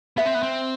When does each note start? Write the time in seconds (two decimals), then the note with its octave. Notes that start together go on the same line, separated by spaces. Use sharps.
0.17 B3 E5
0.26 C4
0.34 B3
0.43 C4